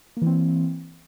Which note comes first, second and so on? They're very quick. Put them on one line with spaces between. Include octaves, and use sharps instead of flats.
A#3 E3 C4